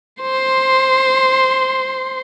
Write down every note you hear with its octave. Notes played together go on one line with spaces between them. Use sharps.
C5 C6